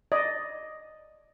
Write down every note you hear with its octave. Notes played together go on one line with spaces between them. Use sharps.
D5 D#5